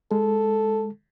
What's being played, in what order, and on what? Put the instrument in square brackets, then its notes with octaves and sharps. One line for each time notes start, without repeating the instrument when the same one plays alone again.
[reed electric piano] G#3 [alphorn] A4